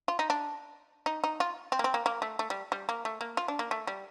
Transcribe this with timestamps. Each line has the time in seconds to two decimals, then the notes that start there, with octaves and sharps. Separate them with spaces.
0.08 F4
0.19 D#4
0.30 D4
1.06 D#4
1.24 D#4
1.40 F4
1.72 C4
1.79 A#3
1.84 C4
1.94 A#3
2.06 A#3
2.22 A3
2.39 A3
2.50 G3
2.72 G3
2.89 A#3
3.05 A3
3.21 A#3
3.37 F4
3.48 D4
3.59 A#3
3.71 A3
3.87 G3